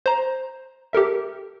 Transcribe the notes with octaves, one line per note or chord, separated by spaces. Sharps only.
C5 A#5
G4 A4 A#4 E5